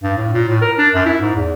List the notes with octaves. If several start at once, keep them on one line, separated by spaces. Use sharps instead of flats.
G2
A2
A#2
A2
A#4
D4
F#2
E4
G#2
E2